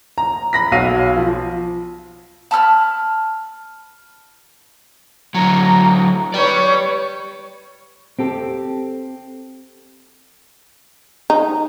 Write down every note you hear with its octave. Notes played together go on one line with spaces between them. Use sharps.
A#5
B5 A#6 B6
B1 F#4 F5 D#7
F3
A5 B5 E6 F6
D3 F#3 A#5
G4 B4 C#5 D5
C4 G4 A4
D#4